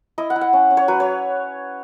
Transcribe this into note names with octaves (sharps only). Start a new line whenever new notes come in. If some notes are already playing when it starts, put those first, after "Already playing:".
E4 D#5
F#5
E4
F#5
C#4
C#4
C#5
F#3 B4
C#5